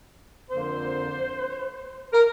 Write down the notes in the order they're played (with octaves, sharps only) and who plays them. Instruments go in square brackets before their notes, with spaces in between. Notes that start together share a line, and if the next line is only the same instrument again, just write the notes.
[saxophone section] F2 D3 A#3 C5
A#4